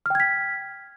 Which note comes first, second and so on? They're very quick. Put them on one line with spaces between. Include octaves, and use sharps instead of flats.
F6 G5 G#6 B6